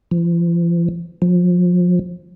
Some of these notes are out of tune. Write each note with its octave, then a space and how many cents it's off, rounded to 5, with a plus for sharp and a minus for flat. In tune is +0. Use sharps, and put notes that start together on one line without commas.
F3 -40
F3 +30